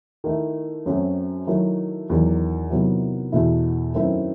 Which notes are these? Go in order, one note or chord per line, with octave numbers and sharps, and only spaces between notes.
D#3 A3 E4
F#2 F#3 A3 C4
D#3 F#3 A3 E4
E2 D#3 F#3
C3 D#3 F#3 B3 E4
E2 B2 A3 E4
F#2 D#3 A3 C4 E4